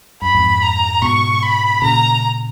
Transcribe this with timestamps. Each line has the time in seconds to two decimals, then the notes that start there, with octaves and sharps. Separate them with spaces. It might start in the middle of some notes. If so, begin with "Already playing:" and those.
0.21 F#2 B5
0.35 F2 G#2
0.61 A#5
1.02 G#2 B2 C#6
1.42 B5
1.82 A#2 C#3 A#5